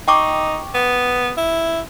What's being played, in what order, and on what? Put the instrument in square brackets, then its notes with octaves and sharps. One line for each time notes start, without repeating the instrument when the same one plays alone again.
[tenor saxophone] D#4 [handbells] G5 C#6 D6
[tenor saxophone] B3
E4